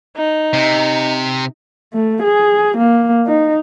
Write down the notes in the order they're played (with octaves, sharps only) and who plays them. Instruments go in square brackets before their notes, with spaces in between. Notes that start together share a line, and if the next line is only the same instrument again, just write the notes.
[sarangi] D#4
[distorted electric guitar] C3
[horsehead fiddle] A3
G#4
A#3
D#4